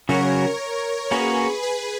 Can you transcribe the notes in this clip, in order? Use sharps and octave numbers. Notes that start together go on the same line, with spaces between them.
C#3 F#3 C#4 F#4 A#4 C#5
A#3 C#4 F#4 G#4 B4 C#5
G#4 B4